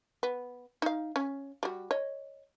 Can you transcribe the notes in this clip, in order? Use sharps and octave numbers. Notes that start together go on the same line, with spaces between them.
B3
D#4 F5
C#4
G3 F#4
C#5 D#5